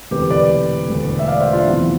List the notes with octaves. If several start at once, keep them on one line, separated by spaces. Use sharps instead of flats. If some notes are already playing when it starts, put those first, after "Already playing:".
E1 D2 C3 E3 G4 B4
B4 D5
E1 D2 D3 A3
E5
D5 F5
C5 E5
D4 F4
E2 C3 F3 B3 E4